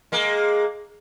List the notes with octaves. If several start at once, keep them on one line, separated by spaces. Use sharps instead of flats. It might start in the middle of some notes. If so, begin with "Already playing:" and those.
G#3 A#3